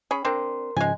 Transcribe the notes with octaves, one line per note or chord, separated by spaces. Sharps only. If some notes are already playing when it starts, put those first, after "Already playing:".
C#4 G#4 B5
C4 D4 A#4 C6
G#2 C#3 F3 G#3 G#5